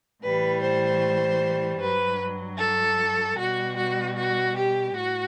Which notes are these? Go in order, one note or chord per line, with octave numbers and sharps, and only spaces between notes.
A2 E3 G3 B4
C5
G2 F#3 B4
A4
B2 G3 F#4
F#4
F#4
G4
A2 F#4